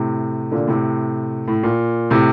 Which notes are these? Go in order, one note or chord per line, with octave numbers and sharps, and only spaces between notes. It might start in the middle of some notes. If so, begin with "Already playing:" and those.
Already playing: A2 C3
A#2 D3
A2 C3
A2
A#2
A2 C3